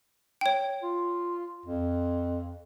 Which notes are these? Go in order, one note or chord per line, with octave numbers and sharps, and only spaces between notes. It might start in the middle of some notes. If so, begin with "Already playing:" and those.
C#5 G5
F4
F2